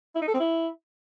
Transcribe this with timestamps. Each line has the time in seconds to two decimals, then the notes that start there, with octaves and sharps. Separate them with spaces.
0.15 E4
0.21 D#4
0.28 A4
0.34 C4
0.40 E4